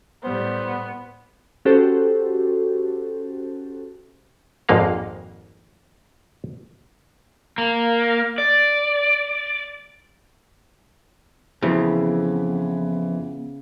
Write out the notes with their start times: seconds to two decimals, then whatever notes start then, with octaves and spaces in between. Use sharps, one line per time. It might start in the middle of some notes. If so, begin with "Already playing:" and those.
0.24 A2 G3 B3 C5
1.65 C#4 F#4 G4 A4 C5
4.69 G#1 F2 G#2 A#3 F5
7.58 A#3
8.38 D5
11.62 F2 C#3 E3 B3